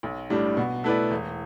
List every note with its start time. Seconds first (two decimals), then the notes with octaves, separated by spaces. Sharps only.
0.03 B1
0.30 A2 G3 D4
0.57 B2
0.84 A3 E4 B4 D5
1.10 E1